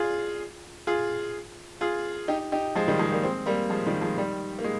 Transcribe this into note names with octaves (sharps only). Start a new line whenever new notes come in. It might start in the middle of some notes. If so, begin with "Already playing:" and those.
Already playing: F4 G#4
F4 G#4
F4 G#4
D#4 G4
D#4 G4
F3 G#3
D#3 G3
F3 G#3
G3 A#3
G#3 C4
G3 A#3
F3 G#3
D#3 G3
F3 G#3
D#3 G3
A#3
G#3